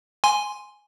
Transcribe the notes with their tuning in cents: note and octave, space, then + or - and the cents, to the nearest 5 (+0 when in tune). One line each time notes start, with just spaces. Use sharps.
G#5 +0 C6 +0